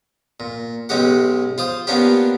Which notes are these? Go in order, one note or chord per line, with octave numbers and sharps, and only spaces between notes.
A#2
B1 G#3 C#4 G4 F#5
F4 C5 D#6
A#3 B3 C#4 D4 F4 G4